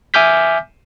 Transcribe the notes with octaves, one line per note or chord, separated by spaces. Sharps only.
E5 G#5 D6 F6 G6 B6